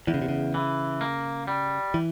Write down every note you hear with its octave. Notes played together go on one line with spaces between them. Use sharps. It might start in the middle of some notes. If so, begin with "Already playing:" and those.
E2 E3
C#3
C3
C#3
E3
A#3
G3
E3